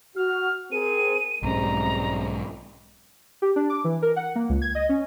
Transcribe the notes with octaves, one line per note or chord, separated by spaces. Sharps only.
F#4 F6
C4 G#4 A#4 D#7
B1 G#2 G3 G#3 C4 C#4 A#5
G4
D4
D6
E3
A#4
F#5
A#3
C#2
G#6
D#5
C#4